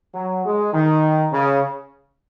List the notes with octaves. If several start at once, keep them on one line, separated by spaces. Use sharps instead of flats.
F#3
G#3
D#3
C#3